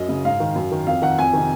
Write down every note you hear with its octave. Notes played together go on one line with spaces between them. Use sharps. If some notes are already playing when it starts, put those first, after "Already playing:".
Already playing: F#2 D#5
C#3
G#2 F5
D#3
F#2
D#3
F2 F5
D#3 F#5
F2 G#5
C3 D#3